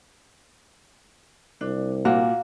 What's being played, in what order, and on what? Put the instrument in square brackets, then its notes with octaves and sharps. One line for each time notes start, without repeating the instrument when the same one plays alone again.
[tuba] C2 [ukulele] D4
[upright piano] A#2 [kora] A#3 [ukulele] F#4